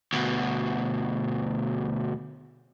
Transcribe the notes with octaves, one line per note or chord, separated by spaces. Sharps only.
D2 B2